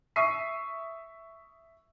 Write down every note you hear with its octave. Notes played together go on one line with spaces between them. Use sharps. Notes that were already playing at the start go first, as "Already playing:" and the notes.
E5 C#6 D#6 C7 D#7